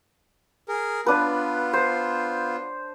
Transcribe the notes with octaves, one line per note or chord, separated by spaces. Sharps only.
G#4 A#4
B3 D4 F4 B4
C5